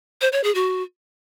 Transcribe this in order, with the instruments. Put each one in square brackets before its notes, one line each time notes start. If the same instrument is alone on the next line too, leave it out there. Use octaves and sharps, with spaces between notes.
[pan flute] C5
C#5
G#4
F#4